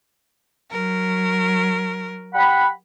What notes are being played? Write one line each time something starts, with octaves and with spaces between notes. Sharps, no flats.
F#3 A#4
G4 F#5 B5